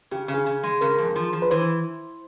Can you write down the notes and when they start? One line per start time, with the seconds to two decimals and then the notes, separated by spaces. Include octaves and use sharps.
0.11 C#3 G4
0.28 C#3
0.34 G#4
0.46 C#3
0.63 G#3
0.81 C#3 A#4
0.98 F2
1.16 F3
1.33 F3
1.42 B4
1.51 E3 C5